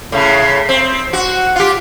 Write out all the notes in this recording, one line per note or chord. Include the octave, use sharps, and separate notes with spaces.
A2 C#3
C4
F#4
F4 G4